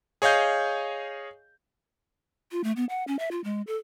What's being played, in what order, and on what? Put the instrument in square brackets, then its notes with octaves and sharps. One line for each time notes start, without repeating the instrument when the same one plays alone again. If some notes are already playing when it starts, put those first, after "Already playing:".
[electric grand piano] G#4 C#5 D#5 F5 G6
[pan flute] F4
A3
B3
F#5
C#4
E5
F4
G#3
A4